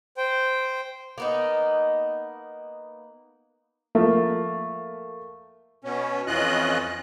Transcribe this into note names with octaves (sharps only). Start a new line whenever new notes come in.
C5 G5
A#3 B3 D#4
F3 A3 A#3
B2 C#4
F2 E3 C#4 F4 D#5 F#6